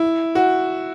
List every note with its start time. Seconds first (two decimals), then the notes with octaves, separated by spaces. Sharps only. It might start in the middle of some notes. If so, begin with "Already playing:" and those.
Already playing: E4
0.35 F#4